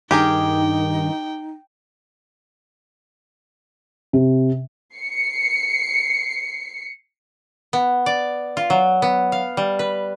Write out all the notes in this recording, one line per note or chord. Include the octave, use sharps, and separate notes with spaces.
G2 D#3 D#4 G4 G#4 A#4 G5
C3
C7 C#7
B3
D5
F4
F#3
B3
F5
G3
B4